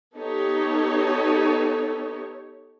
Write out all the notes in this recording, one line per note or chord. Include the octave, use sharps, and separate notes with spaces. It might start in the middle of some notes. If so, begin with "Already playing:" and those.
B3 D#4 G4 A4 C#5